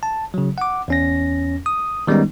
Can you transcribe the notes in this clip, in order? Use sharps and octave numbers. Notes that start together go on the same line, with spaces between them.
A5
C#3 F#3
F#5 D6
E2 C#4 A#6
D#6
D#3 G3 G#3 B3 C#4 D#4